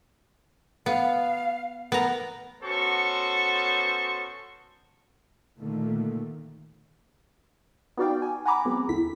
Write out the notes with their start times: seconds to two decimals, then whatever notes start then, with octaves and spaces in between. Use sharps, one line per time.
0.86 B3 F5
1.92 B3 A#4 A#5
2.63 B3 C#4 F#4 A4 C5 C#6
5.58 A#2 D3 D#3 A3 A#3
7.97 B3 D#4 F#4 D5 F5 G5
8.22 G#5
8.45 F#5 G#5 A#5 B5 D6
8.65 F#3 G#3 B3 C4
8.89 E2 D3 E4 B6